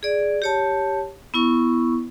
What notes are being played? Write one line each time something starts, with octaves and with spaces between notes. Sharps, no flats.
G#4 D5
G4 C#5 A5
B3 E4 C#6